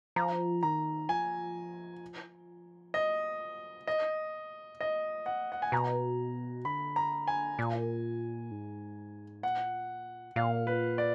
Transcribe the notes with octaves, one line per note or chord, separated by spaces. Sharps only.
F3 A#5
D#3 A#5
F3 G#5
F#3 D#5
B2 D#5
A#2 D#5
F#5
F#5
G#5
B2 A#5
D3 B5
A#5
G#5
A#2
G#2
A#2 F#5
A#2 F5
B4
D5